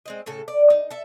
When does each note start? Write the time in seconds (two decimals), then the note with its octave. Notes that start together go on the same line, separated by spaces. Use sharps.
0.06 G#3 C4 D#5
0.26 A2 C#3 A4
0.48 D5
0.70 D#4
0.90 A4 E5